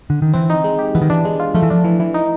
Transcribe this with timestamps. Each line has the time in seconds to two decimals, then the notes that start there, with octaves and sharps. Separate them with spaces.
0.10 D3
0.22 D#3
0.33 E3 C4
0.50 D#4
0.64 G#3
0.79 G4
0.95 E3 B3
1.02 D#3
1.10 E3 D4
1.25 G#3
1.40 F4
1.54 F3 A3
1.63 E3
1.70 F3 D4
1.84 E3
2.00 E3
2.14 D#4